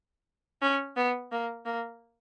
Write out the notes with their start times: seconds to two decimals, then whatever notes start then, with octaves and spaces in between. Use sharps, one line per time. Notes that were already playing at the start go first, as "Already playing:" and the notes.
0.62 C#4
0.96 B3
1.32 A#3
1.65 A#3